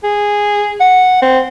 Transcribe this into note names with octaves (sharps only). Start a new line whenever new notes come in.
G#4
F#5
C4